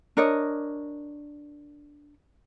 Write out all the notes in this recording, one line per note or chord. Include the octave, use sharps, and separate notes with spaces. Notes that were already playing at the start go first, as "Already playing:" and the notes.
D4 A#4 C#5 D#5